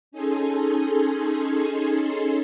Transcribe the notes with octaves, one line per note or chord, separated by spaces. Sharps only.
C#4 D#4 G#4 A4 G#5 C6